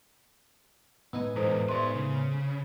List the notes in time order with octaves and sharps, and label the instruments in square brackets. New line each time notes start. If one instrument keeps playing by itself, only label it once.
[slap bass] A2 G#3 [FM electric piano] B3 D#4 G#5 [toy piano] E6
[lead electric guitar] E2 G#2 [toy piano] E4 A4 C5
[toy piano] G4 E5 C6 [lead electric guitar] B4 D5
[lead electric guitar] C#3